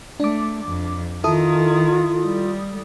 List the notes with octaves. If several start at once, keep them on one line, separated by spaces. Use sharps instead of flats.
A3 D4 D6
F2
D#3 E4 F4 A4 D#6
G3